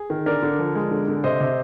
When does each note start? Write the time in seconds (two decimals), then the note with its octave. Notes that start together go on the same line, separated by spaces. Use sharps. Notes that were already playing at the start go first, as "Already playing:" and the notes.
Already playing: G#4
0.10 D#3
0.26 D3 A#4 D5
0.43 D3
0.59 F3
0.75 G#3
0.91 D3
1.08 D3
1.24 C3 C5 D#5
1.40 C3